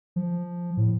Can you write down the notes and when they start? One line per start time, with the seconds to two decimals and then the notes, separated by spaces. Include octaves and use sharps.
0.16 F3
0.77 A2